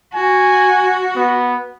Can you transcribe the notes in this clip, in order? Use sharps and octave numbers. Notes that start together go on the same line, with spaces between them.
F#4 G#5
B3